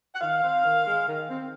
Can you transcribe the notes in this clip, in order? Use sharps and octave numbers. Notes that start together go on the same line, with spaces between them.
F#5
D#3 F5
C4
D#3
G#3
D#3
C4